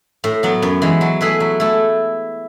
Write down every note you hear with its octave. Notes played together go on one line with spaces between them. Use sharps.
A2
F#3 B3
F#2
E3 G#3
F#3
A3 E4 G#4 B4
F#3
A3 E4